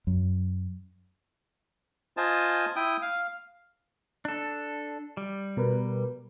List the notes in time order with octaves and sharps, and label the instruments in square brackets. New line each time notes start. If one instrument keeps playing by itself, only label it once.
[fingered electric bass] F#2
[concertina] F4 C5 D#5 G#5 A5
E4 G5 D#6
F5
[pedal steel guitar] D4 A4
G3
[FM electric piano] B2 A#4 B4